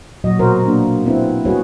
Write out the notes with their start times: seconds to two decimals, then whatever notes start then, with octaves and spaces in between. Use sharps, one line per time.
0.24 A#2 F#3 F#4 D#5
0.39 B2 F#4 A#4 C5
0.64 A#3 B3 D4
1.04 B3 C4 E4 B4
1.45 G3 B3 F#4 G#4 B4 C#5